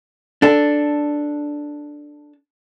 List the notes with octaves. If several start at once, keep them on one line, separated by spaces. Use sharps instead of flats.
D4 A4